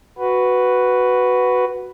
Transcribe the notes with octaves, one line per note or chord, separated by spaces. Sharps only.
F#4 B4